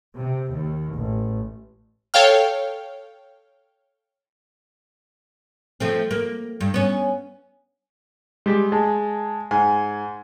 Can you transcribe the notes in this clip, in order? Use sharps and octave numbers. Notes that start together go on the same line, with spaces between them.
C3
D#2
A1
A4 C#5 F5 G5 F6
F3 A3 C4
A#3
G2
B3 C#4
G3 G#3 G4
G#3 A5
G#2 G#5